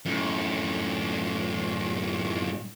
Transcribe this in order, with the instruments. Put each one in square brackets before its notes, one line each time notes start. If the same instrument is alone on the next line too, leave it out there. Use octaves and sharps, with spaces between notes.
[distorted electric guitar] F#2 A2